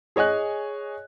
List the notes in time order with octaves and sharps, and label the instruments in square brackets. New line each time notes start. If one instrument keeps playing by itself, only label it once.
[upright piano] G#4 C#5 D#5 G#5 F#6